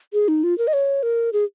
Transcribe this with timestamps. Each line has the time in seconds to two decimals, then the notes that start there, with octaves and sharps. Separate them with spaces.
0.13 G#4
0.28 D#4
0.44 F4
0.58 A#4
0.68 D#5
0.73 C#5
1.03 A#4
1.33 G#4